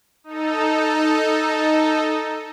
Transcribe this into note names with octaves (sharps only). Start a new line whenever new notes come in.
D#4 A4